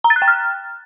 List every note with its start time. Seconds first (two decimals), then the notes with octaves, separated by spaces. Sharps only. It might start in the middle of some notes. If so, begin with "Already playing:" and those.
0.04 A#5
0.10 A6
0.16 F#6
0.22 G5
0.28 F6